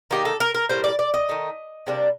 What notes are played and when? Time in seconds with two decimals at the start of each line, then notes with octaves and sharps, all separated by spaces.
0.11 D#3 A#3 D#4 G4
0.25 A4
0.40 A#4
0.54 A#4
0.69 A2 G3 A#3 C5
0.84 D5
0.99 D5
1.14 D#5
1.29 D#3 A3 D#4
1.87 C3 G3 A#3 D4